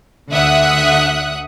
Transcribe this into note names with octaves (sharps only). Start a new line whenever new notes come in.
D2 D3 E5 F#5 D#6 F#6